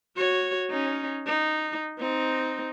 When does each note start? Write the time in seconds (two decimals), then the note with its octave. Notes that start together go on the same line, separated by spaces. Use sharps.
0.17 F#4 C#5
0.70 C#4 D#4
1.26 D#4
1.99 C4 D#4